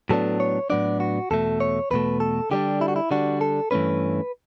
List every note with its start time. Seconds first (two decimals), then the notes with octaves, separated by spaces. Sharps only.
0.09 A2 F#3 B3 D4 A4
0.40 C#5
0.70 A2 F#3 B3 D4 D5
1.00 F#4
1.31 E2 B2 A3 A4
1.60 C#5
1.91 E2 B2 A3 B4
2.20 A4
2.51 D3 G3 D4 G4
2.81 E4
2.88 F#4
2.96 E4
3.11 D3 G3 D4 F#4
3.41 A4
3.71 G2 E3 A3 C#4 B4